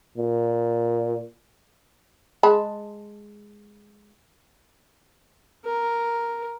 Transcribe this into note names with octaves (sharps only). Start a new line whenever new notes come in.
A#2
G#3 A5 B5
A#4